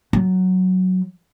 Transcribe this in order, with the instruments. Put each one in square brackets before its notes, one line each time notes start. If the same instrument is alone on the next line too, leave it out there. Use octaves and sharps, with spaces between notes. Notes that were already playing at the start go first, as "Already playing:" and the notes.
[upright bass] F#3